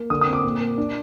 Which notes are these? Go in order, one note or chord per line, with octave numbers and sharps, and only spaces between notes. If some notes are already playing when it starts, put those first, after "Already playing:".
Already playing: A#3
D3 D#6
D#6
C4
D6
A#2
A#3
D4